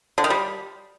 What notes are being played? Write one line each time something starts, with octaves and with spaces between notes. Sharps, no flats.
D3
D#3
G3